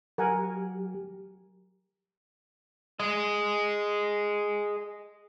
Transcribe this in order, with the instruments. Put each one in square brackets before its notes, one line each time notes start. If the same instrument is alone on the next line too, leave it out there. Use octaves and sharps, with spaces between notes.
[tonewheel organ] F#3 G4 [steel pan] A#4 F#5 G#5
[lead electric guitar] G#4 D#5